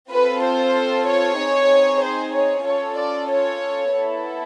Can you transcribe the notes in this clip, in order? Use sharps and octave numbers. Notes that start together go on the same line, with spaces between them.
C4 F4 A4 B4
C5
C#5
C4 D#4 G#4
C5
C#5
C#4 F4 A4 C#5
D5
C#5
B3 E4 A4